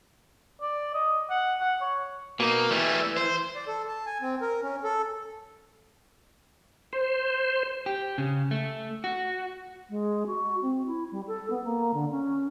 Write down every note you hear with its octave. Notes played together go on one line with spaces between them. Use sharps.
D5
D#5
F#5
F#5
C#5
B2 A#3 D#4
E3 G3 A3
C5
D5
A4
A5
G#5
C4
A#4
C#4
A4
C5
G4
C#3
A3
F#4
G#3
F#4
C4
E4
G3
A4
B3
A#3
D3
C#4